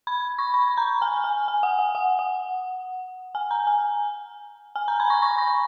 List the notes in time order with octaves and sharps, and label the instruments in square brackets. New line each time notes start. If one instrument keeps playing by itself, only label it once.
[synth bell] B5
C#6
B5
A#5
G#5
G#5
G#5
F#5
F#5
F#5
F#5
G#5
A#5
G#5
G#5
A#5
B5
C#6
C#6
C#6